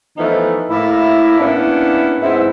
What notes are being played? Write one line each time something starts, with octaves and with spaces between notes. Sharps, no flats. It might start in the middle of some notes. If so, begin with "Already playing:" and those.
E3 F3 A3 B3 D#4
A2 A#3 E4
A#3 B3 C#4 D4 E4
G#2 B3 C4 E4